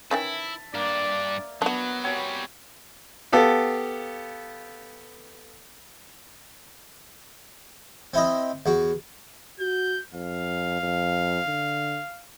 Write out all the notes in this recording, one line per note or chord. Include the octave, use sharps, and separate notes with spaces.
D#3 E3 C#4 E4 E5 A5
G2 A#3 D4 D5
F#3 B3 D4 F#4
F#3 G3 C4 C#5 G#5
B3 G4 A4 F5
C4 E4 D#5
E2 F#4
F#4 G6
F2 F5
F2
D3